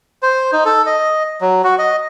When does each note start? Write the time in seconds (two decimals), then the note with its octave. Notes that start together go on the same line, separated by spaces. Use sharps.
0.22 C5
0.53 D#4
0.65 A4
0.86 D#5
1.41 F#3
1.64 F#4
1.79 D#5